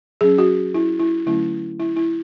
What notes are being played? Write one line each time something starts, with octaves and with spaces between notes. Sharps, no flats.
F#3 C#4 G#4
F#4
E4
E4
D3 F#3 A3 C#4 E4
E4
E4